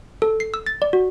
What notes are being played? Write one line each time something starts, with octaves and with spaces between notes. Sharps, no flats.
A4
C7
E6
A6
D5
F#4